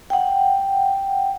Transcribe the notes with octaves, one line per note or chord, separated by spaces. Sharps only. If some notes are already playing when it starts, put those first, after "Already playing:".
F#5 G5